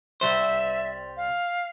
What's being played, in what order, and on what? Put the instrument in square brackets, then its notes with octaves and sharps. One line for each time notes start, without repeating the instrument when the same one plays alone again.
[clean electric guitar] C2 G3 C5 [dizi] E5
[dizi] F5